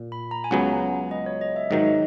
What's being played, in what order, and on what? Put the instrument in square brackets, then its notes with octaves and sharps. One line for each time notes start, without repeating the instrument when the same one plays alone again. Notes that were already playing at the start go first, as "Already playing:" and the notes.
Already playing: [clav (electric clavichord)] A#2
[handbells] B5
A#5
G#5
[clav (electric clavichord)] C#2 C#3 F#3 B3 [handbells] F#5
[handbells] D#5
C#5
D#5
E5
[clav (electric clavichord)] G#2 D#3 F#3 [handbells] D#5
[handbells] D#5